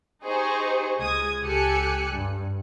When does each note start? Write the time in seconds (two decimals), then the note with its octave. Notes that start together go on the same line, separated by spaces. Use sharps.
0.23 D#4 G4 G#4 C5 C#6
0.98 C#2 G#3 D#6 G#6
1.42 C#2 G4 A4 G#5 F#6 C#7
2.10 G2